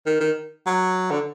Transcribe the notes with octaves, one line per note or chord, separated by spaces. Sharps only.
D#3
D#3
F#3
D3